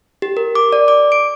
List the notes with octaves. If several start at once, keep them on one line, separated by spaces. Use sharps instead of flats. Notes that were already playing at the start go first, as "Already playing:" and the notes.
G4
A#4
D6
D5
D6
D7